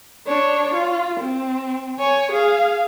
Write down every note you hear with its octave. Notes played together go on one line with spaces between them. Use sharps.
D4 C#5
F4
C4
C#5 G#5
G#4 F5